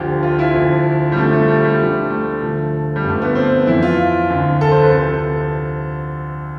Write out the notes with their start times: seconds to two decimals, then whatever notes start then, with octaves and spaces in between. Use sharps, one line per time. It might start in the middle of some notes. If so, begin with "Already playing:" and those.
Already playing: D2 D3 F3 G4
0.23 F4
0.39 E4
0.54 D2 D3 F3
1.12 G3
1.17 D2 D3 F3 A3
1.33 A3
1.48 G3
1.64 G3
1.79 D2 D3 F3
2.10 A3
2.42 D2 D3 F3
2.96 G3
3.04 G2 D3 F3 A3
3.22 B3
3.35 C4
3.67 F2 E3 E4
3.82 F4
4.30 D2 D3 F3
4.61 A4
4.72 C5
4.81 B4
4.91 D2 C3 F3 A4